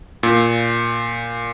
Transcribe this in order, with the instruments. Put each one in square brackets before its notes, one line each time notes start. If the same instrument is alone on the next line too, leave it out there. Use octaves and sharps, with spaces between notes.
[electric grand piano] A#2